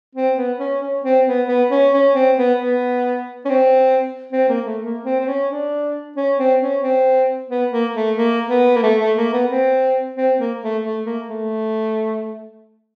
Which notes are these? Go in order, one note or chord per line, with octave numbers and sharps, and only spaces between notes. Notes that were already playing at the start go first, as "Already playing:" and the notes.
C4
B3
C#4
C#4
C4
B3
B3
C#4
C#4
C4
B3
B3
C#4
C4
C4
A#3
A3
A#3
C4
C4
C#4
D4
C#4
C4
C#4
C4
B3
A#3
A3
A#3
B3
A#3
A3
A3
A#3
B3
C4
C4
A#3
A3
A3
A#3
A3